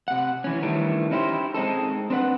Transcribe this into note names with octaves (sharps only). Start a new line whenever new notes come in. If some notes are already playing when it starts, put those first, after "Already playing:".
C3 F#5
E3 C#4
D#3 E3 G3 A3 D4
C#4 D#4 E4 G4 C5
G#3 C4 D#4 A4
C4 D4 B4 F#5